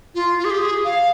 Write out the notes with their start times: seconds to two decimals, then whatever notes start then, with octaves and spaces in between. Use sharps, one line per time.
0.15 F4
0.38 F4
0.45 G#4
0.51 G4
0.62 G#4
0.85 F5